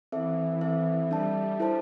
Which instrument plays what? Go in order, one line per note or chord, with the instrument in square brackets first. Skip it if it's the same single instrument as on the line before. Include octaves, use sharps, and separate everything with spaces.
[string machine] E3 [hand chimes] C4 A4 E5
[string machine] E3 [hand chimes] C4 A4 E5
[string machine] G3 [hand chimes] D4 A4 E5 A5
[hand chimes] E4 A4 C5 A5